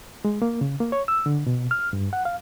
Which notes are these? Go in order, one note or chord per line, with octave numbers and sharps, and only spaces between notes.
G#3
A#3
C#3
A#3
C#5
E6
D3
B2
F6
G2
F#5
F5